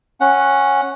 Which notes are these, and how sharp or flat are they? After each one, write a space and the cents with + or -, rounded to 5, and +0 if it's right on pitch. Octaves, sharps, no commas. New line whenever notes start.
C#4 -10 F#5 +0